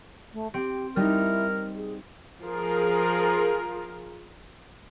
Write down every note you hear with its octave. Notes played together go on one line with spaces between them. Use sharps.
A3
C4 G4 D7
G3 D#4 E4 A#4
G#4
F3 F4 G#4 A#4